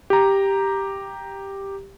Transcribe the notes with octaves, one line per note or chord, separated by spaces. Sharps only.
G4 A#5